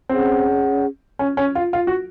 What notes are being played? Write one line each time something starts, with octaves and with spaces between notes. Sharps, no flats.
C4 C#4 G#4 C#5 F#5
C#4
C#4
F4
F4
F#4